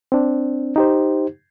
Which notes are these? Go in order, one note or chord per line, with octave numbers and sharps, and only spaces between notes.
C4 D4
D#4 G4 C5